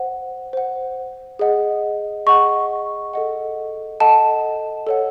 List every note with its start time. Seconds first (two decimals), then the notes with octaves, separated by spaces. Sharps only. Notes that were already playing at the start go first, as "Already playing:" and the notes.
Already playing: C5 F#5
0.53 C5 F#5
1.39 G#4 D#5 F#5
2.26 G#4 D#5 F#5 C#6
3.14 A4 D#5 F#5
4.00 A4 D#5 F#5 A5
4.87 A4 C#5 F#5